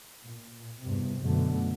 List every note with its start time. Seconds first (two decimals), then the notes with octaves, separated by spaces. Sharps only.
0.25 A#2
0.83 E2 G2 C3
1.19 F#2 B2 D3 A3